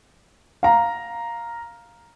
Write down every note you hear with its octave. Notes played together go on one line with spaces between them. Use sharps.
F5 A#5